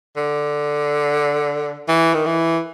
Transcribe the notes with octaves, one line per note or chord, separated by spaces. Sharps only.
D3
E3
D#3
E3